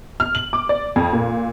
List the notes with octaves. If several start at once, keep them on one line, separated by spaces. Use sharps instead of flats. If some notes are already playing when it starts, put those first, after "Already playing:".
F6
F#7
D6
D5
F2
A#2